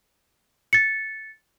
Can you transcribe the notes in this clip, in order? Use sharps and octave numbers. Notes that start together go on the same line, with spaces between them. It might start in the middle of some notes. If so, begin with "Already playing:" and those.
A6 C#7